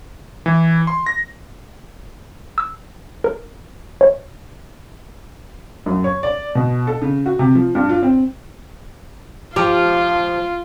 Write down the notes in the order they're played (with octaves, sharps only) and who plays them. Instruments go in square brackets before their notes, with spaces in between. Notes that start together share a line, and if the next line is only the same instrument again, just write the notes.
[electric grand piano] E3
C6
A#6
[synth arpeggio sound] E6
A#4
C#5
[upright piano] F#2
C#5
D5
B2
A4
C#3
F#4
C3
F3
G2
F4
C4
[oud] F3 G4 [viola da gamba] F4